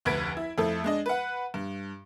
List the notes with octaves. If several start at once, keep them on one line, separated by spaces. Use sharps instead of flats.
F1 D2 B4 G#6 B6 D7
E4
F2 A3 E4 A4
G#3 D4 D#5
B4 F#5
G2